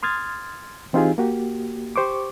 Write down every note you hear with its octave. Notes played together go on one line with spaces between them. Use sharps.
C6 D#6 F6 G#6 A6
E3 C4 D#4 F4 G4 G#4
A#3 F#4 G4
G4 C5 C#6 D6